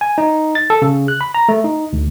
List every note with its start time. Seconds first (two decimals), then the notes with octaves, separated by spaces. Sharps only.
0.01 G#5
0.18 D#4
0.55 A6
0.70 A4
0.82 C#3
1.08 F#6
1.21 B5
1.35 A#5
1.49 A3
1.64 D#4
1.93 D2